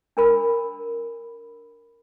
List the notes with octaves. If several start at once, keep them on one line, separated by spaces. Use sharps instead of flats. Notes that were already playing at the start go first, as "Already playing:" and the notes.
D4 A#4 B5